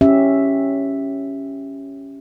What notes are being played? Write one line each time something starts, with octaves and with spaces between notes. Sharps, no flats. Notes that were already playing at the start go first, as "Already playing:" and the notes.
C#4 G4 E5